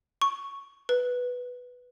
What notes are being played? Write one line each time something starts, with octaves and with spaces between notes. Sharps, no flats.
C#6
B4